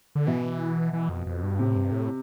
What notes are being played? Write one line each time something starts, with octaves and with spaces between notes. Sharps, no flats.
D3
B2 E3
E3
F2
F2
G2
A2 C3
G2
A2